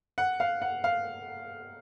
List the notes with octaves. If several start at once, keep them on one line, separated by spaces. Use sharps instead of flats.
F#5
F5
F#5
F5